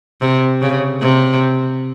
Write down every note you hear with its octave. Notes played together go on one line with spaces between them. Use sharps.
C3
C#3
C3